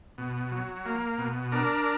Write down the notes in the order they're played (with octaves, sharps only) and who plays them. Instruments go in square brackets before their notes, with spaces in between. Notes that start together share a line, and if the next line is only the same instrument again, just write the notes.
[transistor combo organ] B2
F#3
A#3
B2
D4 A#4